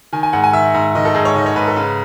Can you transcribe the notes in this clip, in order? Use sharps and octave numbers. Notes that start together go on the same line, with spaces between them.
D#3 G#5
G#5
G#2 F#5
G#5
D#3 E5
G#2
D#3 D#5
A4
G#2 G#4
C#5
D#3 D#5
C#5
G#2 B4
A4
C#3 B4